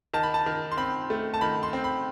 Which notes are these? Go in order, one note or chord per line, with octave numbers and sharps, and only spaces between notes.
D#3 A5
B5
A5
D#3
C6
C4 B5
A3
A5
D#3 B5
C6
C4
B5